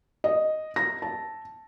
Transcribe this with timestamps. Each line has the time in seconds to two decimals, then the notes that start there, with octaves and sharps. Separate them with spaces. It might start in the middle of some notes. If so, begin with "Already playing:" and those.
0.24 D#5
0.76 A#6
1.02 A5